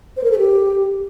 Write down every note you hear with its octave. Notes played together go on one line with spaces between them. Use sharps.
C5
A#4
A4
G4